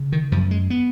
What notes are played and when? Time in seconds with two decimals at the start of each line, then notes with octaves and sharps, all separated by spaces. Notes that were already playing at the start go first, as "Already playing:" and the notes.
Already playing: C#3
0.12 D#3
0.32 F#2 F3
0.51 G#3
0.70 B3